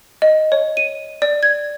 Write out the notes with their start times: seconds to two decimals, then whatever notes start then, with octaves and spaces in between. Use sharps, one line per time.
0.22 D#5
0.52 C#5
0.77 D#7
1.22 D5
1.43 G#6